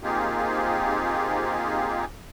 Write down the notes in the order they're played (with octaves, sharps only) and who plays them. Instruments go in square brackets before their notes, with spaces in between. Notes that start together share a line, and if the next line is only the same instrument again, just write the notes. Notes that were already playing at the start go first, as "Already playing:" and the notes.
[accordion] A#3 C4 D#4 F4 G4 G#4